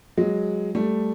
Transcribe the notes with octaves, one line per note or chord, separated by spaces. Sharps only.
F#3 G#3
G3 A3